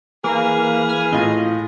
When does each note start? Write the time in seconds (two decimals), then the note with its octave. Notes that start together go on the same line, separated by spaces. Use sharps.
0.24 E3 A#3 G#4 B4 F6
0.89 G#5
1.12 A2 F4 D#5